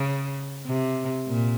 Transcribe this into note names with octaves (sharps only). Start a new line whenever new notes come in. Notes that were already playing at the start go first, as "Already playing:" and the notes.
Already playing: C#3
C3
A#2